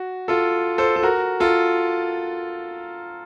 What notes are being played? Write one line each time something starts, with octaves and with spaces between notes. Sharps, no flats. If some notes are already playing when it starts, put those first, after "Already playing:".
Already playing: F#4
F4 A4
A4 C5
A4
F#4 A#4
F4 A4